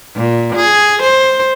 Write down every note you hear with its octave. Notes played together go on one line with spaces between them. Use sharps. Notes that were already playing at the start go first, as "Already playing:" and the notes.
A#2
G#4
C5